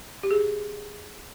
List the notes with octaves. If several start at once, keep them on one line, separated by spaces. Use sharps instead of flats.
G4
G#4